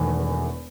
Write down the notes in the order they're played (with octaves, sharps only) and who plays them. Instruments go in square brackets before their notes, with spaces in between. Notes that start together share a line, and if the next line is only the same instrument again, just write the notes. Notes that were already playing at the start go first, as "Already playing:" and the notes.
Already playing: [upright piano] E1 E2 D#3 A3